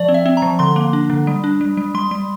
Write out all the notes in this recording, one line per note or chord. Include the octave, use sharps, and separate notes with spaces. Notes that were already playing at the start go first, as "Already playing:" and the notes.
Already playing: F3 D5
C4
E5
C4
A#5
F3
D3 C6
A#3
D4
D3
G3
D4
G3
G3
G3 C6
G3